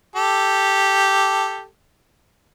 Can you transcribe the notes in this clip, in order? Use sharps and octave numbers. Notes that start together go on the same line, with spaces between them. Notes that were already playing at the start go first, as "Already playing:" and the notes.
G4 A4